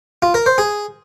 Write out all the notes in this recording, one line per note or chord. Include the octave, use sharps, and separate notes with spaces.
F4
A#4
C5
G#4